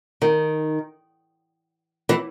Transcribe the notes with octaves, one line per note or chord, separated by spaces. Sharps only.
D#3
E3